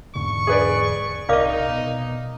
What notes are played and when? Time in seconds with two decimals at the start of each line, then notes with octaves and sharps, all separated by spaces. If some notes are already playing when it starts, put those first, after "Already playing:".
0.15 E2 G#2 D3 C#6
0.47 G#4 B4 D5
1.29 C2 D#4 A#4 D5 D#5 F5 D6
1.68 B2